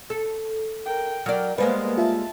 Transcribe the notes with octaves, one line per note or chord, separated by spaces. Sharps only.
A4
A#4 G5
F#3 A#4 D5 G5 F6
G3 G#3 A#3 B3 B4 C5 D#5 F5
F4 E5 A5